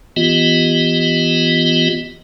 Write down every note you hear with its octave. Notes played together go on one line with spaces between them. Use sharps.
E3 B3 F4 G4 D#5